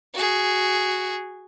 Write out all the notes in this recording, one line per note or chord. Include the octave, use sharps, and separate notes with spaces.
F#4 G#4